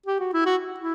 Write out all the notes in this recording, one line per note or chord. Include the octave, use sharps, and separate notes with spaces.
G4
F#4
E4
F#4
E4